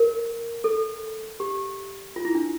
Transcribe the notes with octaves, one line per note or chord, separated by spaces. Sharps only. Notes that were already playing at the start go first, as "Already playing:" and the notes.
Already playing: A#4
A4
G4
F4
E4
D4